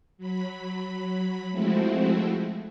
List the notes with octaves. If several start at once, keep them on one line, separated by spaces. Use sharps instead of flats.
F#3 B5
F3 G#3 A3 C4 E4 F#4